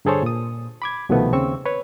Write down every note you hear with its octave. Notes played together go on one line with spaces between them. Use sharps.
G2 D3 G#4 A4 C5 C#5
A#2 D#6
B5 D6 G#6
C2 B2 D#3 F3 A3 B3
D#2 C#3 C4 C#6 E6
B4 C#5